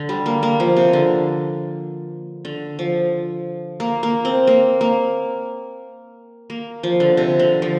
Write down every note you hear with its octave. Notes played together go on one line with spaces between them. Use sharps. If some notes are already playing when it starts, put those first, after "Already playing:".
Already playing: D3
G3
A#3
A#3
F3
C3
D3
D3
F3
A#3
A#3
C4
A#3
A#3
A#3
F3
D3
C3
D3
F3